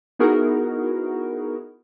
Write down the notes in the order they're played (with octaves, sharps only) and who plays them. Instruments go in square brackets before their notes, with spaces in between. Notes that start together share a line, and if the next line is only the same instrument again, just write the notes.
[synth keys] B3 D#4 E4 F#4 G#4 A#4